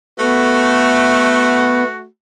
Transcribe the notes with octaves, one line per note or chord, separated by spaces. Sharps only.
A3 B3 F#4